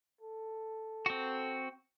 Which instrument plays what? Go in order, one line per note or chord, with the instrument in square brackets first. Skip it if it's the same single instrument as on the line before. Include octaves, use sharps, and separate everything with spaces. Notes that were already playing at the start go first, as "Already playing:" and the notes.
[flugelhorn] A4
[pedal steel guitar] C4 F#4